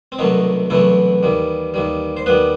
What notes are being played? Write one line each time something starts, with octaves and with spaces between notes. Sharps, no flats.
C4
C2 B2 D#3 F#3 A3 D#4
C2 B2 E3 F#3 A3 E4
D#2 D#3 G3
D#2 D#3 G3
C5
D#2 D#3 G3 B3 B4